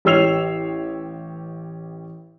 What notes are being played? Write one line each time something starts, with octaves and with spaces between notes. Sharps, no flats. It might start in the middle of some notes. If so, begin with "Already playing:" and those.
A1 G4 C#5 E6 C7 F7